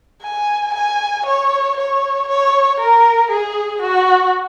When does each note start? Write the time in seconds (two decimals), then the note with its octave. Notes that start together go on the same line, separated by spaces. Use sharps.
0.23 G#5
0.74 G#5
1.26 C#5
1.77 C#5
2.28 C#5
2.80 A#4
3.30 G#4
3.82 F#4